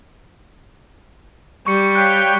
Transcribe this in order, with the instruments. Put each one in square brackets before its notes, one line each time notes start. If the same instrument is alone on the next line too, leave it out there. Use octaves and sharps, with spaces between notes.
[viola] G3 [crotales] C#6 C#7
[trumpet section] C#5 F5 G5 [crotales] F#6 B6